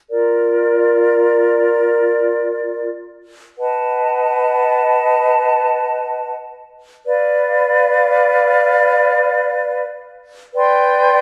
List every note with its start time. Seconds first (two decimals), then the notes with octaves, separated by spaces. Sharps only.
0.10 F4 A#4 D5
3.57 B4 D#5 F#5 A5
7.05 B4 D5 F5
10.54 B4 D5 G5 C6